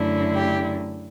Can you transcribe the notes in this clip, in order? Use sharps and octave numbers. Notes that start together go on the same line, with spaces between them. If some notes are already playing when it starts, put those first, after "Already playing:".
Already playing: F#2 D3 A3 E4
G4